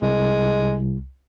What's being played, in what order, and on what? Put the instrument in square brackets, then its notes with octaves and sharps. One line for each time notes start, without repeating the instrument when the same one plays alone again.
[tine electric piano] C2 [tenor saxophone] G#3